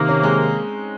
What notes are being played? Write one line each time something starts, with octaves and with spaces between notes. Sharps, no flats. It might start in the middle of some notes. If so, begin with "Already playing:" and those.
Already playing: C3 D#3 A#3 C4 D#4
C#4
G#3